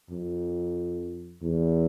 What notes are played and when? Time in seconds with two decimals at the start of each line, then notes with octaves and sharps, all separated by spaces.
0.11 F2
1.43 E2